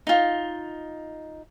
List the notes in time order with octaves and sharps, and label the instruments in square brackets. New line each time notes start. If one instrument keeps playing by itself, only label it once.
[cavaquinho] D#4 F4